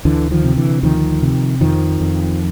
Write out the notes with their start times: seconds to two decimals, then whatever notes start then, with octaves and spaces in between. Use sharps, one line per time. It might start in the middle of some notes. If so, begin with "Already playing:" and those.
0.05 D2 D3 E3
0.31 D#3 F3
0.44 C3
0.57 D3 E3
0.83 D2 D#3 F3
1.22 C3
1.61 F2 D#3 F3
2.00 F2